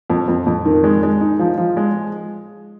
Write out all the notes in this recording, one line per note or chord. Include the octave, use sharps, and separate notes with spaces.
F2
F2
F2
D#3
G#3
G#3
D#4
F3
F3
G#3